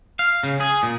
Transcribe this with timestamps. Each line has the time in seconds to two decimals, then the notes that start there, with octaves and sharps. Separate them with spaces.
0.19 F5
0.43 C#3
0.60 G#4
0.83 A#2